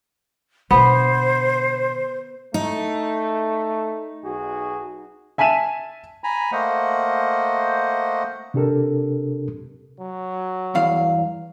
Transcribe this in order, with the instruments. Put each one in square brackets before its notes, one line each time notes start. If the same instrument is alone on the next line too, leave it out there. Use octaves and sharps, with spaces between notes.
[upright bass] B2 D3 [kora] B3 [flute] C5
[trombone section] A3 [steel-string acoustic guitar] D#4
[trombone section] B1 F#4 G#4
[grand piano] E5 G#5 A5 B6 D#7 E7
[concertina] G#5 A#5 B5
A3 A#3 C5 D#5 F#5
[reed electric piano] C3 D4 G4 A4 A#4
[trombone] F#3
[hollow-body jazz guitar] E2 G2 F5